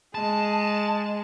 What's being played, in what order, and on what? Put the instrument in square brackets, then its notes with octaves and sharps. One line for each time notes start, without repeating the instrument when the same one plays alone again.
[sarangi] G#3 [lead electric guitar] A5